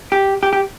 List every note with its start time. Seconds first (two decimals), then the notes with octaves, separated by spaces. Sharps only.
0.12 G4
0.43 G4
0.53 G4